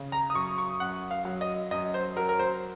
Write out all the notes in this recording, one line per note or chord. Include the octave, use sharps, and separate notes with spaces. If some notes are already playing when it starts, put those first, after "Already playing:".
Already playing: C#3
A#5
D#6
F#2 C#6
C#6
F#2 F#5
F5
F#3
D#5
F#2 D#5
C5
F#3 A#4
A#4
C5